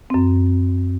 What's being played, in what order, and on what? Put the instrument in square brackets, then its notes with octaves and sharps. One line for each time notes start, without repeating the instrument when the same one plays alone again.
[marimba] F#2 C4